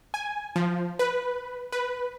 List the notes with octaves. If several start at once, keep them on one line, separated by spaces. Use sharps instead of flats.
G#5
F3
B4
B4